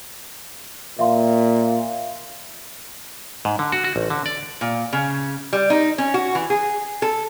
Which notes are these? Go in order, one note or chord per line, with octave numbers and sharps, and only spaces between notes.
A#2 E5 F5 C6
G#2
D3
F#4
F#4
A1
D3
D5
A#2
C#3
G3
D#4
C#4
F#4
E3
G#4
A4